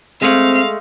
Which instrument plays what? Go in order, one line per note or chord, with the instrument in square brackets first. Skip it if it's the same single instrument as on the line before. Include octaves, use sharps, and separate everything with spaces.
[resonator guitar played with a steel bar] G#3 A3 [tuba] C4 [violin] F5